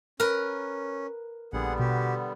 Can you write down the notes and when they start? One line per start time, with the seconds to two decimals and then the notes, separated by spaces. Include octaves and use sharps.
0.20 C#4 A#4 B4
1.53 A#1 D3 G3 B3 G#4 F#5
1.79 B2 F#4 G4